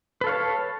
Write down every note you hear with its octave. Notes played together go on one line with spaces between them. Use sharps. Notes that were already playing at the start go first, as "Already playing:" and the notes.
A4 B4 C#5 F5 A5